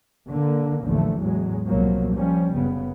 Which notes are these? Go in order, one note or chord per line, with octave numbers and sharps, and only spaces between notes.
D3 A#3
A1 D#2 D3 E3 F3 A3
E2 A2 F#3 G#3
C2 B2 F3 F#3 A#3
F3 G3 C#4
F#1 C#3 B3